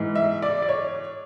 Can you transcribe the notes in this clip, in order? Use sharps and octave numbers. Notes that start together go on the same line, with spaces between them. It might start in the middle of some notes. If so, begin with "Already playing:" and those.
Already playing: G#2 E3
E5
D5
D5
C#5